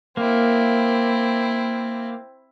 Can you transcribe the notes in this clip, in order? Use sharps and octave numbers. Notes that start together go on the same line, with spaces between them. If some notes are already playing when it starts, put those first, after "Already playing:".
A#3 C4 E4